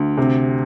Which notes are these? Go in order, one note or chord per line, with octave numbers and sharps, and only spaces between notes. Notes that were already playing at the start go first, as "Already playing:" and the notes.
Already playing: D2
C3